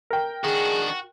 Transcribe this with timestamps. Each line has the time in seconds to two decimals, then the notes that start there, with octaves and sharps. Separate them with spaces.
0.10 A#4 G5
0.44 D#3 D4 F#4 G#4